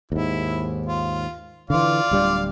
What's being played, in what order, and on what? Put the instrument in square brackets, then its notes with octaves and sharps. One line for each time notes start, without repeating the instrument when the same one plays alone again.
[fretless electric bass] D#2 G#2 [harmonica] E4
[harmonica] F4
[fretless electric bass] D3 E3 [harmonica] F4 D5 F5
[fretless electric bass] D1 G3 D4